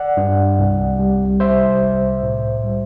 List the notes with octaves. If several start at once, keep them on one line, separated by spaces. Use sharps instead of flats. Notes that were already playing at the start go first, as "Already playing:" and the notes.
Already playing: D5 F#5
G2
C2
G3
C3 C5 E5
C2
A2
G3